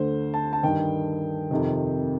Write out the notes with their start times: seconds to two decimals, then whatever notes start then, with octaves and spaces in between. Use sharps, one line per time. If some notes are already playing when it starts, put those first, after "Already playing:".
Already playing: D2 D3 C5
0.34 A5
0.53 A5
0.63 G2 D#3 G5
1.51 F2 C3 D#3